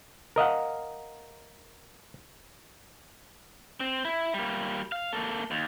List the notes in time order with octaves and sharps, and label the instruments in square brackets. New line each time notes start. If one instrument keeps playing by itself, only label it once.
[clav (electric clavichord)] A#4 D#5 F5 F#5
[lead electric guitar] C4
E4
G3 A#3
F5
A#3 A4
D#2